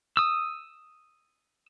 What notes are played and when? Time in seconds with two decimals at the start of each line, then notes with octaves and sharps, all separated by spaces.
0.17 D#6 E6